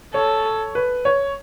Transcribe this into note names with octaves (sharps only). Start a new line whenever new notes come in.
A4 C#5
B4
C#5